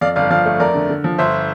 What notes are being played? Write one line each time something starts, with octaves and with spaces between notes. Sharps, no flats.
F2 D5 F5
G1 D5 F5
F3 D5 F5
A3
F2 A#4 D5
D3
D3
F3
G1 C5 E5